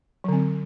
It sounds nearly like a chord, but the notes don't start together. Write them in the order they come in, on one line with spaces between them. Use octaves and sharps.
F#3 D3 C4